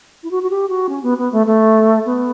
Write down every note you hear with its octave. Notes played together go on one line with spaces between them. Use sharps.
E4
F#4
F#4
G4
F#4
C#4
B3
B3
A3
A3
B3